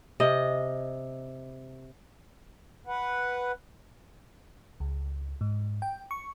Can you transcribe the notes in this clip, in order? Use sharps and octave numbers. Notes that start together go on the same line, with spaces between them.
C3 D#5
B4 F#5
C#2
G#2
G5
C#6